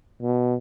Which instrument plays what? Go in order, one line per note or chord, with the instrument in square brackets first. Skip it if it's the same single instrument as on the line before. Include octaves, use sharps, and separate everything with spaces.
[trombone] B2